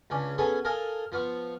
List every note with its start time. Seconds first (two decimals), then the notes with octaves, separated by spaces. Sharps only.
0.10 C#2 C#4 D4
0.38 B3 C#4 G#4 A4 C#5 G#5
0.65 A4 A#4 D#5 F5 G#5
1.12 F3 B3 F5 C#6